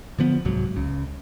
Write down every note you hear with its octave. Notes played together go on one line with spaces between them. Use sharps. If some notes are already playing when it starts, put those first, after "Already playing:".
D3 F3 B3
C2 G#2 F#3
C#2 C#3